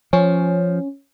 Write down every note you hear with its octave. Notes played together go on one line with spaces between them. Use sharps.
F3 C#4